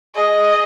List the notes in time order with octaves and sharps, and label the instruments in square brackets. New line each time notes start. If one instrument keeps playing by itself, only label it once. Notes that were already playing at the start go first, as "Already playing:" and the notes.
[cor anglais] G#4 [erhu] D#5